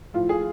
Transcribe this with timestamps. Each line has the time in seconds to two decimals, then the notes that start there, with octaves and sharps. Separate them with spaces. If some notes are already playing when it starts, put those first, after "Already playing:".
0.14 A2 F3 F4
0.29 G#4